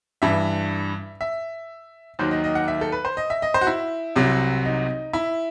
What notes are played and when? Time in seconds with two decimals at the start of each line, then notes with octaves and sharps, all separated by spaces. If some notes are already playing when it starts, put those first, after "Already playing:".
0.22 G2 E3 E5
1.21 E5
2.19 D#2 D#3 F#3 C5
2.31 D#5
2.44 D#5
2.55 F#5
2.68 E5
2.81 A4
2.92 B4
3.05 C5
3.17 D#5
3.30 E5
3.42 D#5
3.54 C5
3.61 F#4
3.67 E4
4.16 C2 C3 F#3
4.65 D#4
5.13 E4